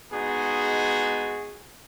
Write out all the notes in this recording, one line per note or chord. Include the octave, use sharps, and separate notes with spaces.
G#3 B3 D#4 F#4 G#4